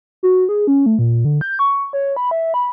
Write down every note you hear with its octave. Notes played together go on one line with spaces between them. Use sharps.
F#4
G#4
C#4
A3
A#2
D3
G6
C#6
C#5
B5
E5
B5